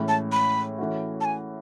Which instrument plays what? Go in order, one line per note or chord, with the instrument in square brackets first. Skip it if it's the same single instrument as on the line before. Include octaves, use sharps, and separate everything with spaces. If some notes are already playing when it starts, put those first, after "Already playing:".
Already playing: [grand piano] A2 E3 G#3 C#4
[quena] A5
B5
[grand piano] E3 A3 C#4 F#4
[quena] A5
G#5